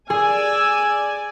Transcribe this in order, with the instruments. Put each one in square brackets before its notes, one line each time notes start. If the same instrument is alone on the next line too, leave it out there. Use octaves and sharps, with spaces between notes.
[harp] G#4 [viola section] D5 G#5 [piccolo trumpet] E6